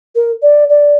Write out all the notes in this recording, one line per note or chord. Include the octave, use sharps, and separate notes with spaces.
A#4
D5
D5